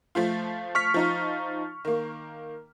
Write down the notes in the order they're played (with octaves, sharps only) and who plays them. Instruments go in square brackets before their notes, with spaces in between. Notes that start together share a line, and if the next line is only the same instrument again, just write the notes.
[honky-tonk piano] F3 A3 F4
[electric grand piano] C#6 F6 B6
[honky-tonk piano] F3 D#4 F4
D#3 A#3